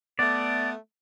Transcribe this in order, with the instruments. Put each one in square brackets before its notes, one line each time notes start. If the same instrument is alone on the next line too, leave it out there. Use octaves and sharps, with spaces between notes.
[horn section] A3 B3 [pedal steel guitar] D5